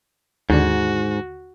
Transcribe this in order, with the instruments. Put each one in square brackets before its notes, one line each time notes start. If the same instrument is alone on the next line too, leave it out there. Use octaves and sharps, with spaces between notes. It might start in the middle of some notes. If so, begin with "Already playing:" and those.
[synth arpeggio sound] D#2 D3 [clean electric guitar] G#2 [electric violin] F#4